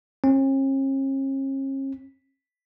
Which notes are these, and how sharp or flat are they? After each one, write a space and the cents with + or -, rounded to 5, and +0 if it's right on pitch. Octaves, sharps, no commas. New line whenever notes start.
C#4 -45